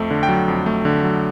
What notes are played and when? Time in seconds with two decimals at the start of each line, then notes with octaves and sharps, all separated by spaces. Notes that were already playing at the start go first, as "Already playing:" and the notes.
Already playing: F2 A3
0.11 D3
0.23 G5
0.29 F#3
0.48 F2
0.66 A3
0.85 D3
1.04 F#3